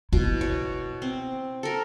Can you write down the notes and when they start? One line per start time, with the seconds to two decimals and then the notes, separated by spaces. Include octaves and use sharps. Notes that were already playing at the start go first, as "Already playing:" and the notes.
0.13 B2 E4
0.41 C#5
1.02 C4
1.63 A4 A#4